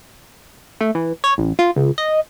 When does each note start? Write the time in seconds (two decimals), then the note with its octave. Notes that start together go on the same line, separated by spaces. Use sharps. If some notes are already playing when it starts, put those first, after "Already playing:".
0.81 A3
0.95 E3
1.24 C#5
1.38 A1
1.59 F4
1.76 C#2
1.98 D#5